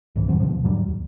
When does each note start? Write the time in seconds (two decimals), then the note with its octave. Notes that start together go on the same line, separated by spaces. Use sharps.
0.16 C2 G#2 E3
0.28 F2 D#3 F#3 C4
0.40 D#2 B2 D3 F3
0.64 G#2 D3 F#3 G3
0.88 D#2